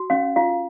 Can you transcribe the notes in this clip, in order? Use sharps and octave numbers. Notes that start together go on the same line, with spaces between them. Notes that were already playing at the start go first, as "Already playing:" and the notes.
Already playing: F#4
C#4 F5
F4 F5